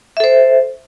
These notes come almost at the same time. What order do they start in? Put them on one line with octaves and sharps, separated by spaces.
E5 A4 C5